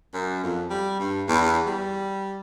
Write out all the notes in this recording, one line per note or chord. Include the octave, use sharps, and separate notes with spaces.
F#2
F2
G3
G2
E2
G3